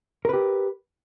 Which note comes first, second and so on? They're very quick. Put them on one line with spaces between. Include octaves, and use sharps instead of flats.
A#4 B4 G4